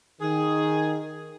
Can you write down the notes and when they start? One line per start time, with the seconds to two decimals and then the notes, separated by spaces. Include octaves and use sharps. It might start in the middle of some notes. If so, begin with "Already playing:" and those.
0.21 D#3 G#4